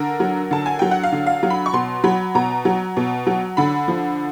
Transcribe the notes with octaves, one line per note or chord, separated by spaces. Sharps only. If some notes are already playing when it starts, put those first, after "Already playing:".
Already playing: D3 A#4
F#3
D3 A5
G#5
F#3 G5
F#5
F5
D3
F5
F#3
B5
C#6
B2 C6
F#3 B5
B2 A#5
F#3
B2
F#3
D3 B5
F3